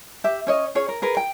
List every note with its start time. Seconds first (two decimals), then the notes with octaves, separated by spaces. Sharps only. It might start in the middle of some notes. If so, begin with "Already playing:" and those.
0.24 G4 E5
0.47 C#4 C#5 D#5
0.75 C#4 G#4 C#5
0.88 A#4
1.02 G#4 A#4 B4
1.17 G5